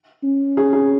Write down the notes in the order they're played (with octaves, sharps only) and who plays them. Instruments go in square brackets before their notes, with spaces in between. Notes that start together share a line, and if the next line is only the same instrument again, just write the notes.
[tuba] C#4
[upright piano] G#4
G#4